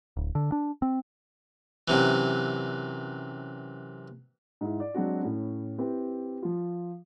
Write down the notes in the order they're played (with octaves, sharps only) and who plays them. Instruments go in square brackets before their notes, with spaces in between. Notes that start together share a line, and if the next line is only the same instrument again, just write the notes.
[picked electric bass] D1
D3
D4
C4
[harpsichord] F#2 C3 E3
[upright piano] G#2 E4
D5
F#3 G#3 C4 D4 F#4
A2 C#4
C4 E4 G4 B4
F3 F4